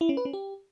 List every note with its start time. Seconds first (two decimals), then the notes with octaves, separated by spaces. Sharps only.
0.01 E4
0.09 C#4
0.17 B4
0.25 C#4
0.33 G4